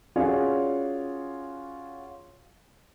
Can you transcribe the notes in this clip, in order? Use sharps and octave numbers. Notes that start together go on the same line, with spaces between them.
C#4 F4 F#4 G#4 C#5 D5